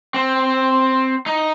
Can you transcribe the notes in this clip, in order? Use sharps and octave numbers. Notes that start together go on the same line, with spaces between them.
C4
D#4